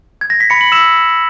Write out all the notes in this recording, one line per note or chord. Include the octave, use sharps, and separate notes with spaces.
G#6
A#6
B6
B5 C#7
F#7
E6 E7